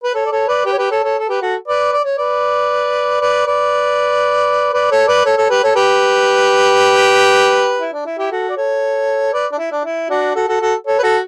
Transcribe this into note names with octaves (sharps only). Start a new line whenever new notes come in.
B4
A4 C#5
D5
A4 C#5
B4 D5
G4 B4
C#5
G4 B4
A4 C#5
A4 C#5
A4
G4 B4
F#4 A4
B4 D5
D5
C#5
B4 D5
B4 D5
B4 D5
B4 D5
A4 C#5
B4 D5
A4 C#5
A4 C#5
G4 B4
A4 C#5
G4 B4
E4
D4
E4
E4 G4
F#4 A4
D5
A4 C#5
B4 D5
D4
E4
D4
E4
D4 F#4
F#4 A4
F#4 A4
F#4 A4
A4 C#5
B4
F#4 A4